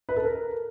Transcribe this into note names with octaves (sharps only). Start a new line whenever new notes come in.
B4
A4
A#4